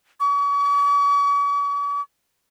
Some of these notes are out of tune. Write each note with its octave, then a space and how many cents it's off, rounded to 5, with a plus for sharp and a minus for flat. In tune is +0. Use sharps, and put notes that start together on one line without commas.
C#6 +45